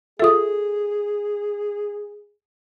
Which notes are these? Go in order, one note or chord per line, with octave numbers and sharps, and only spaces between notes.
F4 G#4 A4 E5 D#6